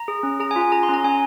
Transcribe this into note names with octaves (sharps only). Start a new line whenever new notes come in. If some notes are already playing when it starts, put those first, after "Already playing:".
Already playing: A#5
G#4
C#4
G#4 A#5
G#5
F4
G#5
G#4 A#5
C6
C#4 A#5
C#4 G#5